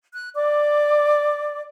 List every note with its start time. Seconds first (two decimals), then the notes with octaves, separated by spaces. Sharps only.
0.14 F#6
0.35 D5 D6